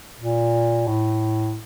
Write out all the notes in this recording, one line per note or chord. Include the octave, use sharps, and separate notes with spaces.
A#2
A2